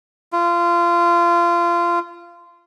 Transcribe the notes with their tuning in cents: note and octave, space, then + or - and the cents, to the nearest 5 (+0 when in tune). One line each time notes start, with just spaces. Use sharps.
F4 -25